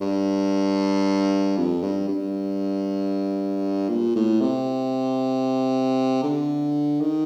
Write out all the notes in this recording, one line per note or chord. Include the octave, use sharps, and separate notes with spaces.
G2
F2
G2
G2
A#2
A2
C3
D3
D#3